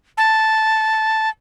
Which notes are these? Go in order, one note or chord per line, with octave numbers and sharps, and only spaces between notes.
A5